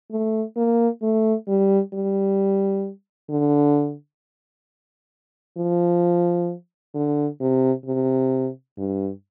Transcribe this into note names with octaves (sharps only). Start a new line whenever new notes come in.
A3
A#3
A3
G3
G3
D3
F3
D3
C3
C3
G2